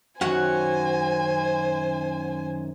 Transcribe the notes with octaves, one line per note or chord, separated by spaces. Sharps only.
F#2 D#3 F#4 C5 C#5 F#5 G#5